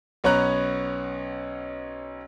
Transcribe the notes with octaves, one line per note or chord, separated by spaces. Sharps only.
B1 B3 C#4 C#5 A#5 F#6